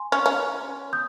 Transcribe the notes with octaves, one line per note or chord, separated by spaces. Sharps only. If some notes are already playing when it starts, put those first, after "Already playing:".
Already playing: G#5 C6
C#4
C#4
D#6 G6